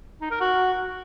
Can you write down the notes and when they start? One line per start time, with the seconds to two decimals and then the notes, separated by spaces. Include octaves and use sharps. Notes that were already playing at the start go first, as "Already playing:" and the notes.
0.21 D#4
0.31 A#4
0.41 F#4